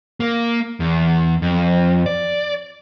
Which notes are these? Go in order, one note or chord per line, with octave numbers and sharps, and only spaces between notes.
A#3
E2
F2
D5